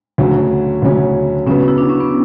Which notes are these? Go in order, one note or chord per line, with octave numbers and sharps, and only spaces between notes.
D2 C#3 F#3 C#4
D2 C#3 F#3 C#4
C#3 F#3 B3 C#4
E4
D4
C#4
B3